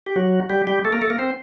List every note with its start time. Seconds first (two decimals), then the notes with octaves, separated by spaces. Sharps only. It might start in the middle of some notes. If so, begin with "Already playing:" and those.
0.06 G4
0.16 F#3 F#4
0.50 G3 G4
0.67 G3 G4
0.85 A3 A4
0.92 A#3 A#4
1.01 A3 A4
1.10 A#3 A#4
1.18 C4 C5